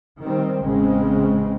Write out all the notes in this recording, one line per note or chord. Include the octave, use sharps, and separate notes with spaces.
D#3 G3 C4
A1 C#3 G#3 C4